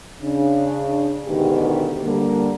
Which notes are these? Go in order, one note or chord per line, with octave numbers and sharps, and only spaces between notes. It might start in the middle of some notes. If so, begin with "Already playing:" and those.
C#3 D4
D2 G#2 B2 D#3 G4
D3 G3 A#3